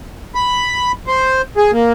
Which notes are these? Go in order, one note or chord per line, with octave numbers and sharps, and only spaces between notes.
B5
C5
G#4
A#3